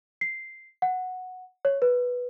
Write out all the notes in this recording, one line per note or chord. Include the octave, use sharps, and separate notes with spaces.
C7
F#5
C#5
B4